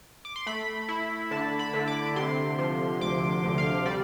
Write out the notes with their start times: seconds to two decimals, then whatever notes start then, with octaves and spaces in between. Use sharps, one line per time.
0.25 D6
0.36 C6
0.46 A3 B5
0.88 E4
1.31 D3 A5
1.59 B5
1.74 D3
1.88 D6
2.16 C3 C6
2.59 F3
3.01 D2 D6
3.44 D2
3.58 F5
3.86 G3 D5